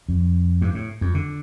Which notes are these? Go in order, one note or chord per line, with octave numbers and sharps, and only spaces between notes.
F2
G2
A2
F2
D3